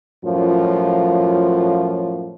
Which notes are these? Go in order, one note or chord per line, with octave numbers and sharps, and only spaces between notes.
F#2 A2 F3 F4